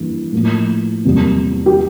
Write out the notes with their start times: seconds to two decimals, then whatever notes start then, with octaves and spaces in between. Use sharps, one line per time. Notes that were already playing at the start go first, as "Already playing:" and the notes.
Already playing: G2 E3 A#3
0.32 A2 F3 A#3
1.05 E2 C3 G3 A#3
1.66 G4